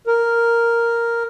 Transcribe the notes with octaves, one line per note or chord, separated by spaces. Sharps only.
A#4